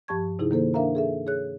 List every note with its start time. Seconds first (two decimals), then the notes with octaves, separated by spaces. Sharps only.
0.08 G2 F3 G4 A5 C#6 G#6
0.39 C3 D#4 E4 G#4
0.51 D#3 A#3 A4 C5
0.74 D4 A#4 E5 F5 A#5
0.95 G#4 A4 E5
1.27 G#4 C#5 F#6